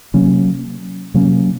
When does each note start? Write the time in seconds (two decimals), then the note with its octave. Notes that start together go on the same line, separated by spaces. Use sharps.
0.14 C3 F#3 A#3 C#4
1.14 C3 F#3 A#3 C#4